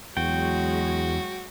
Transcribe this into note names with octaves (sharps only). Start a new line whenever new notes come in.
E2 F#3 G#3 F#4 G5